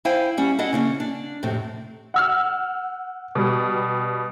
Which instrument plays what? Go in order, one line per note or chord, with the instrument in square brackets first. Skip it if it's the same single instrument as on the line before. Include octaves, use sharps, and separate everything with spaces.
[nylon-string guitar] E4 C5 F5 G5 G#5
G3 C#4 F#5
D4 E4 D#5 F#5
C#3 A#3 C#4
D4
F2 A2 C3
[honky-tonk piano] F#5 E6 F6
B2 G3